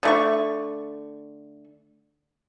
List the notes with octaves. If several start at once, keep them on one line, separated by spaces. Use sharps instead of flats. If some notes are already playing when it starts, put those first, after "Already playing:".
D3 A3 C#6